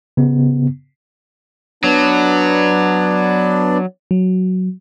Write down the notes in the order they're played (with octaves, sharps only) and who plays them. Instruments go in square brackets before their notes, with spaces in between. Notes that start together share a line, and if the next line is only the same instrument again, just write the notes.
[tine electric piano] C#3 B3
[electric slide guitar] F#3 [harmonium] B3 D4 D5
[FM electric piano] F#3